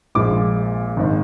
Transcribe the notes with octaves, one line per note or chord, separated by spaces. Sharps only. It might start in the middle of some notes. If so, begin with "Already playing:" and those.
A#1 A#2 G#3 D6
G#1 G#2 D#3